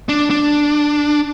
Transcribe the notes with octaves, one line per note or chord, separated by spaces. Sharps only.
D4
D4